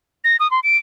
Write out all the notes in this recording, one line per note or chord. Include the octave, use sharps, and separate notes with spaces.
A#6
D#6
C6
D7